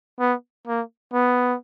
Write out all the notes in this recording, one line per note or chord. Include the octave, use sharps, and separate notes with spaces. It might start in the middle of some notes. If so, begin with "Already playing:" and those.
B3
A#3
B3